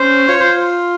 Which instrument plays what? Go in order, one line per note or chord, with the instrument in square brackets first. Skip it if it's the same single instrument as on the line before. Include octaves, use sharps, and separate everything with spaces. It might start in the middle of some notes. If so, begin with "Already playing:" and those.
Already playing: [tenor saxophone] C#4 [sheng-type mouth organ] C5
[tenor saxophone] F4 [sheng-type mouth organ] C#5
[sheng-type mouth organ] C5